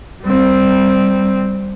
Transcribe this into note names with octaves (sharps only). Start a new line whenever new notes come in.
G3 C4